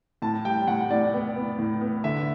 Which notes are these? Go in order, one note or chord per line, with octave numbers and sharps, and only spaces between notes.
A2 A5
G3 G5
A2 F#5
A2 D5
B3
B3
A2
B3
D3 E5